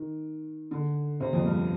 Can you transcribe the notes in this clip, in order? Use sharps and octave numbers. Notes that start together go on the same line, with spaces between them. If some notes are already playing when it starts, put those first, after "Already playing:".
Already playing: D#3
D3
C3
F2
G2